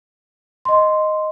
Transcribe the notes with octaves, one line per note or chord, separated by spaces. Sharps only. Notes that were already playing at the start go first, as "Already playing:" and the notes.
D#5 C6